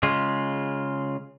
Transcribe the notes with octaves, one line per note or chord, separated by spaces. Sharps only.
C#3 G#3 F4